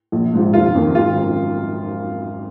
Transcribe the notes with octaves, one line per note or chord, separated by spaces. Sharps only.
A#1
G#2 F3
F1 F4
F2 D#3
G#1 F4
F#2 F3